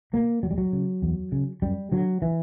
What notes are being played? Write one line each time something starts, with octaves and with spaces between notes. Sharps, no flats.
B2 A#3
E2 F#3
G3
F#3
C#3
E2
C#3
F#2 G3
D3 F#3
E3